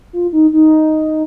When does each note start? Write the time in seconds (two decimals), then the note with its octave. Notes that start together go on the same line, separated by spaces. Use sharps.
0.13 F4
0.33 D#4
0.53 D#4